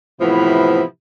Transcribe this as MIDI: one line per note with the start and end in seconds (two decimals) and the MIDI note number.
0.21 0.82 45
0.21 0.82 48
0.21 0.82 52
0.21 0.82 53
0.21 0.82 59
0.21 0.82 64